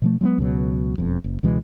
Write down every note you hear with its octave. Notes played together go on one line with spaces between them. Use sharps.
B2 F3 A3
F#3 G#3 A#3 B3
C#2 B2 F#3
E1 F2
F#1
C#2 B2 E3 G#3